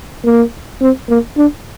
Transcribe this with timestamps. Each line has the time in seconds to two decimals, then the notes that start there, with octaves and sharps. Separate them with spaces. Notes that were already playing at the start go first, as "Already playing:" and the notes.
0.25 A#3
0.81 C4
1.09 A#3
1.37 D4